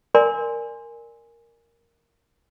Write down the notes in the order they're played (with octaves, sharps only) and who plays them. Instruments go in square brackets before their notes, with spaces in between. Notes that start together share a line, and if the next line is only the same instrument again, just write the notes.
[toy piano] A#4 D5 G#5 C6